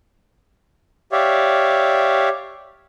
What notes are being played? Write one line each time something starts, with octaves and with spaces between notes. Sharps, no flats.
G4 C#5 D5 E5 F5